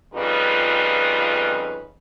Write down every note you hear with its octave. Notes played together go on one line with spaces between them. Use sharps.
F2 C#3 G3 D#4 F4 B4